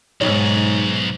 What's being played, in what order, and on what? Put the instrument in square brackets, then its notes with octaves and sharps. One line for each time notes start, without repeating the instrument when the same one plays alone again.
[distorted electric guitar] B1 [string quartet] G#2 [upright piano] D#4 C#5